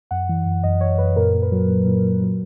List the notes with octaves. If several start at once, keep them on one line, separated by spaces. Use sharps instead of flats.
F#2 F#5
E3
F#2
F#2 D#5
E3 C#5
F#2 B4
A#2 A#4
A#2
B4
F#3
A#2
A#2
A#2
F#3